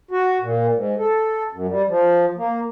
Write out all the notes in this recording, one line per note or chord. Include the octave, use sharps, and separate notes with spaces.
F#4
A#2
G#2
A4
F#2
G3
F3
A#3